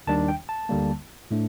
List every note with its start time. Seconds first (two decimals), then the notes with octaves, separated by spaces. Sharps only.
0.07 D#2 D#3 G3 D4 A5
0.28 G5
0.49 A5
0.69 D2 D3 G3 A#3
1.31 A2 A3 D4